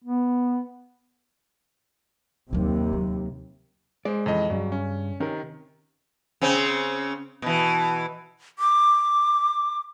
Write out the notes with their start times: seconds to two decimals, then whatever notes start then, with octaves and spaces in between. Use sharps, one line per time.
0.04 B3
2.53 D#2 C3 F#3 A#3
2.93 F#3
4.05 G#3 C5 D5
4.26 F2 C#3 E3 G#3 D#5
4.50 G2 C#3 F#3
4.72 C#4
5.20 C3 D#3 C#4 A#4
6.41 C#3 C4 C#4
7.42 B2 E3
8.59 D6